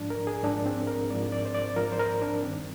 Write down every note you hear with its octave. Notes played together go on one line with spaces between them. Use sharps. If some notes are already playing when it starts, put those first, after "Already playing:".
Already playing: G#2 F3 D4
A#4
G#4
G#2 F3 D4
C4
A#4
G#2 F3 D5
D5
C5
D5
G#2 F3 A#4
C5
A#4
D4
G2 D#3 C4